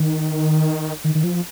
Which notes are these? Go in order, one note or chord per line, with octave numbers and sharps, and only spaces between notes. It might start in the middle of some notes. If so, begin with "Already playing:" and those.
Already playing: D#3
D#3
D#3
F3